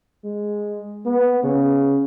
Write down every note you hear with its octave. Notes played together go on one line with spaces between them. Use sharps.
G#3
B3
C#3